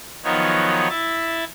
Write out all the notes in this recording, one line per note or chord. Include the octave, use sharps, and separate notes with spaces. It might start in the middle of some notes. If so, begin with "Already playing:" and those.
D#3 F3 F#3 B3 D#4 C#5
E4 E5 A6